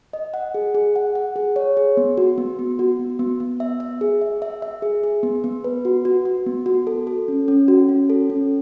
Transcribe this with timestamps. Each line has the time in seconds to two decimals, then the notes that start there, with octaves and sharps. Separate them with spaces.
0.13 D#5
0.34 F#5
0.54 G#4
0.75 G#4
0.96 F#5
1.15 F#5
1.36 G#4
1.56 C#5
1.77 G#4
1.97 B3
2.17 F#4
2.38 B3
2.59 B3
2.79 F#4
2.99 B3
3.19 B3
3.40 B3
3.60 E5
3.80 E5
4.01 G#4
4.21 E5
4.42 E5
4.62 E5
4.82 G#4
5.04 G#4
5.23 B3
5.44 B3
5.64 B4
5.85 F#4
6.05 F#4
6.25 F#4
6.46 B3
6.66 F#4
6.87 A4
7.07 A4
7.28 C#4
7.48 C#4
7.68 F#4
7.89 C#4
8.10 A4
8.30 C#4